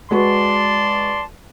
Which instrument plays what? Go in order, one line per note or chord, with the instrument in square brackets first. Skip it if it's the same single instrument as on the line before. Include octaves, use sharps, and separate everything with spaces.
[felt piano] G#3 F#4 B4 [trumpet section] D5 A5 C6